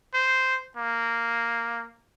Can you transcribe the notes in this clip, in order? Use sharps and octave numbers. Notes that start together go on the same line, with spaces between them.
C5
A#3